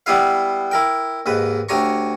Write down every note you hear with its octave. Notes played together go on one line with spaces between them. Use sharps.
G3 B3 E4 B4 F5
E4 A#4 G5
D#2 G#2 B4
D2 G4 C#5 G#5 A#5 C#6